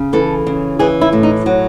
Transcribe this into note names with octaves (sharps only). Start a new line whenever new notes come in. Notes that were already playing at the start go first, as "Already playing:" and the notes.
Already playing: C#3
E3 A4
C#3
E3 G#4
E4
A2
D#4
F#3